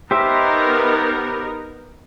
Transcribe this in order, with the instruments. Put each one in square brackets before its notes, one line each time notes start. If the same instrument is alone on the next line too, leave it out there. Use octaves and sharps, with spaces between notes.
[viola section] B3 D#4 A#4 [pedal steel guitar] G4 C5 E5